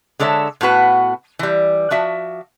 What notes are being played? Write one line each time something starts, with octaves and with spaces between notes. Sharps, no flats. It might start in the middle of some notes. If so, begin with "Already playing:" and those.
D3 G#3 A4 C#5 E5
A2 B3 F#4 B4
E3 G3
F3 F#4 E5